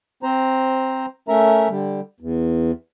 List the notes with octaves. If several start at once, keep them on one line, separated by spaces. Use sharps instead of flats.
C4 C5 A#5
A3 C#4 A#4 E5 A#5
D3 G3
E2